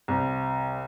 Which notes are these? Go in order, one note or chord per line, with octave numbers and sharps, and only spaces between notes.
C2